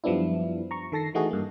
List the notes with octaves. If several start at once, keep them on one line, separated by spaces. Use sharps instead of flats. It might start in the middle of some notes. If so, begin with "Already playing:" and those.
F#2 F3 G3 B3 D4 E4
A#5 C#6
D#3 A4 A5 A#6 C7
E3 A3 D#4 F#4 G#4 A4
G2 A#3